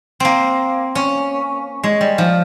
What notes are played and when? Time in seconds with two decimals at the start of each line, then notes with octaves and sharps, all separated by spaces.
0.20 A#3 C4
0.95 C#4
1.84 G#3
2.01 G3
2.18 F3